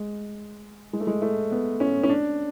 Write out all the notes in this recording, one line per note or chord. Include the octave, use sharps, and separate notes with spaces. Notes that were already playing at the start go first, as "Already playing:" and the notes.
Already playing: G#3
G#3
A3
G#3
A3
B3
C#4
C#4
D4